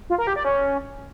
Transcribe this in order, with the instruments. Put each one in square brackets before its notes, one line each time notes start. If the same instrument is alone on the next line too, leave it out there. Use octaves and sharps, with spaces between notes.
[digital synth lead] F4
A#4
G4
D5
C#4